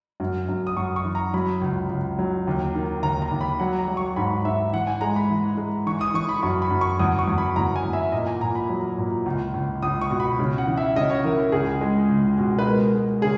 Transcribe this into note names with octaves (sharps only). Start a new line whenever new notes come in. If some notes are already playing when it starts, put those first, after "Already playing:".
F#2
F#2
D#6
F#2 C#6
C#6
E3
A#5
F#3 B5
C#2
C#2
F#3
D#2
D#3
D#2 A#5
A#5
D#2
B5
F#3 F#5
A#5
F#3
C#6
G#2 B5
G#2 E5
E3 F#5
G#5
G#3 A#5
B5
E3
G#3
E3 C#6
D#6
E3 C#6
B5
F#2 C#6
B5
F#2
C#6
E2 D#6
C#6
E2
B5
E2 A#5
G#5
E2
E5
A#2 D#5
G#5
A#2 A#5
B5
F#3
A#2
C#2
C#2
C#2 D#6
C#6
B2
B5
C#3
F#5
E3
E5
C#3 D#5
C#5
E3 A#4
C#2 G#4
G#3
C#2
B2
B4
G#3 A#4
G#3
C#3 G#4